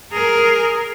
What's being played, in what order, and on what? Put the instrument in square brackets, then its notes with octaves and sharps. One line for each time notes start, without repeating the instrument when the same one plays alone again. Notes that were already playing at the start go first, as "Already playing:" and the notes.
[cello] G#4 A#4